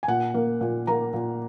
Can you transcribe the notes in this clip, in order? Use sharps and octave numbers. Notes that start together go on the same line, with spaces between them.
G#5
A#2 F#5
A#3
A#2
A#3 A#5
A#2